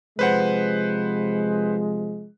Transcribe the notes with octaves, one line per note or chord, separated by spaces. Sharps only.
C3 F3 G#3 B4 C5 F#5